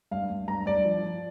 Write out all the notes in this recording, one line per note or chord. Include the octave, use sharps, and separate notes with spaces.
G2 F5
G2
G2 A#5
G2 D5
F3
F3